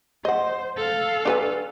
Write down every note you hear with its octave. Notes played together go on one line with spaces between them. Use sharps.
C5 D#5 F#5
A4 F5
D4 B4 G#5